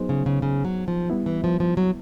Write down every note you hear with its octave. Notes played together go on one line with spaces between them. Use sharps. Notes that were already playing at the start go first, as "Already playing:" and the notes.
Already playing: F#3 B3 D#4 G#4 C5
C#3
C#3
C#3
F#3
F3
G3 B3 E4
E3
F3
F3
F#3